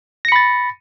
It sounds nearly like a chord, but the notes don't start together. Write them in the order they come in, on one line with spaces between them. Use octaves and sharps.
A#6 C#7 B5 A6